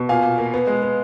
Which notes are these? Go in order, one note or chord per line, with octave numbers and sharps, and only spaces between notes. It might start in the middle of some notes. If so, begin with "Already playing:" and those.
Already playing: B2
A#2 F5 G#5
A#2
A#3
B3
G#3
B3